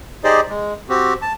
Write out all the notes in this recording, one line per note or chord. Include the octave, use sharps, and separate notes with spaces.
D#4 G4 G#4 C5 D5 D#5
G#3
C4 F#4 G4
A5